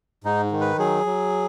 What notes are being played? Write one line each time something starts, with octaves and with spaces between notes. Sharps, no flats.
G#2 D#4
D#3
B4
F#3 G#4
F#3